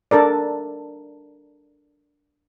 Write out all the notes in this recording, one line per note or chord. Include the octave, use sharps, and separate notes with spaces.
D4 A4 A#4 D5